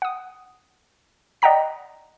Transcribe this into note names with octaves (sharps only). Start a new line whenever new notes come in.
F#5 D#6
D5 D#5 F#5 G5 A#5 B6